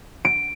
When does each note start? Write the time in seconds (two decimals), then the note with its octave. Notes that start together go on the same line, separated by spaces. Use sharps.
0.25 D7